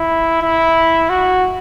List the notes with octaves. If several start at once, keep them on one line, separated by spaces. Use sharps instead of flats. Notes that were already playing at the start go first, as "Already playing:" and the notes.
Already playing: E4
E4
F#4